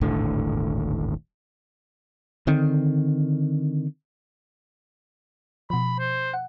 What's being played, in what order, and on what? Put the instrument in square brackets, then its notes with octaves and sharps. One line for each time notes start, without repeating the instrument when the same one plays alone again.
[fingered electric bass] D#1 G#1 A2 D3
D3 D#3 C4
[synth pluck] B2 F3 [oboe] B5
[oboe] C5
[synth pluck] F#5